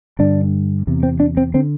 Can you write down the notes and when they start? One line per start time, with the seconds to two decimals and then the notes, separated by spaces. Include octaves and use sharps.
0.19 G2 D3 D4
0.87 E2 C3
1.03 C4
1.20 D4
1.37 C4
1.54 D3 C4